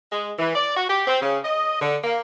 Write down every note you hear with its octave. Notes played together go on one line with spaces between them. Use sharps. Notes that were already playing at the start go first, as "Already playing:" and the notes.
G#3
E3
D5
F#4
G4
C4
C#3
D#5
D3
A#3